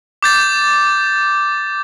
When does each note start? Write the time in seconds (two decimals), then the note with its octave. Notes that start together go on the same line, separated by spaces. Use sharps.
0.23 D6 G6 A6